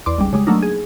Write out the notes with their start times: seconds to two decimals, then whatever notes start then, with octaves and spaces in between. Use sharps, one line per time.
0.06 E2 D5 C6 D6
0.18 G#1 C#2 G3
0.33 C#3 G3 G#3
0.47 F#3 A3 A#3 D4 D#4
0.63 G#4